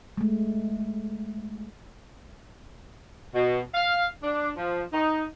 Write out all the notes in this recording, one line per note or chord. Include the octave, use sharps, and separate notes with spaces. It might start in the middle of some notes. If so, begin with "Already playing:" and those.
G#3 A3
B2
F5
D4
F3
D#4